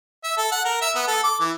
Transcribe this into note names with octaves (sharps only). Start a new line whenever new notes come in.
E5
A4
F#5
A#4
E5
B3
A4
D6
E3